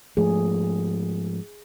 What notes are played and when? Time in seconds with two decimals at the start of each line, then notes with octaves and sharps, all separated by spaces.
0.17 G#2 F3 A3 G#4